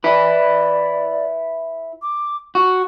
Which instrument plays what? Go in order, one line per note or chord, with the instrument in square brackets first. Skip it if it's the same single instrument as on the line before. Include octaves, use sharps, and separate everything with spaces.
[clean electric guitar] E4 B4 [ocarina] D5
[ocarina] D6
[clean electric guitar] F#4 [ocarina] C#6